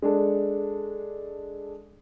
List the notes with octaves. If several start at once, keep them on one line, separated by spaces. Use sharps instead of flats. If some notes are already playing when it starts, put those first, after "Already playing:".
G#3 D4 A4